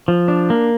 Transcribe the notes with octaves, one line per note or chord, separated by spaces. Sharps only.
F3
D4
A#3